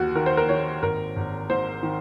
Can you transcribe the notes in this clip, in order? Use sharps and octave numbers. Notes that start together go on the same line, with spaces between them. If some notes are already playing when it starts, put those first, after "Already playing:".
Already playing: D#2 D#3 F#4
D#3 A#4
C5
A#4
D#3 C#5
G#1 A#4
G#1
G#2 C5
D#3